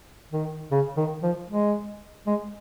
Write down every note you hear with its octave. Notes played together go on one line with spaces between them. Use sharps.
D#3
C#3
D#3
F3
G#3
G#3